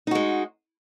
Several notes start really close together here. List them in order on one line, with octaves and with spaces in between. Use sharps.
D#4 F#4 G#3